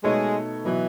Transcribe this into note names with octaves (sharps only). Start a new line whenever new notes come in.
B2 G#3 A3 D#4 A4 C#5
B2 E3 F#3